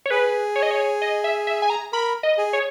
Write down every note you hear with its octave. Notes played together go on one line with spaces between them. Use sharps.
C#5
G#4 B4
C#5
D#5
C#5
D#5
E5
E5
G#5
A#5
A#4 B5
D#5
G#4
C#5